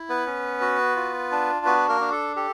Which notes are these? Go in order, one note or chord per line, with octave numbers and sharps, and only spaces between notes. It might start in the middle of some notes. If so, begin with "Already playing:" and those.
Already playing: E4
B3 B4
C#4
F#4
F4
D4
B3 F#4 B4
A#3 A#4
D4
A4
G4 A4